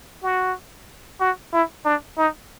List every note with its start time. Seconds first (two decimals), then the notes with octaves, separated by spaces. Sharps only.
0.23 F#4
1.20 F#4
1.53 E4
1.85 D4
2.17 D#4